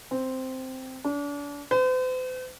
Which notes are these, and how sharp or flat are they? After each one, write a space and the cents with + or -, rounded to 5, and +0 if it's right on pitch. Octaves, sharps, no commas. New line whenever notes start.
C4 -5
D4 -35
C5 -45